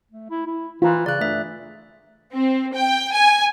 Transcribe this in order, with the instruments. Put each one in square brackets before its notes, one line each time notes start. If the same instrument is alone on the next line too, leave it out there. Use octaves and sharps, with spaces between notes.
[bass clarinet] A3
E4
E4
[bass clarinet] E3 [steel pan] F4 A#5
[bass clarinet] C#3 [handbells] D5 F#6
[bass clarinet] G2 [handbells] A3 E5
[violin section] C4
G5
G#5